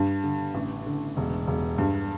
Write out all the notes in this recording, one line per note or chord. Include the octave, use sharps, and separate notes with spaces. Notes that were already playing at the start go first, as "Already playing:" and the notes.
Already playing: G2
D3
A1
D3
E1
E1
G2